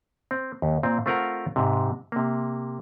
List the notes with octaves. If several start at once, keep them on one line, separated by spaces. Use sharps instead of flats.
C4
D#2
A#2 C4
A3 C4 F4 A#4 F#5 A#5
G#2 C3
C3 A#3